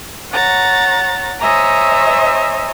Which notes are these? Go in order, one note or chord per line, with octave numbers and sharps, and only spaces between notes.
C#5 F#5 A#5 A6
C5 C#5 D#5 E5 G#5 A#5